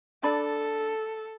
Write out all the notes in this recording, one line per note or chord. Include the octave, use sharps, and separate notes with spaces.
D4 A4 D5 B5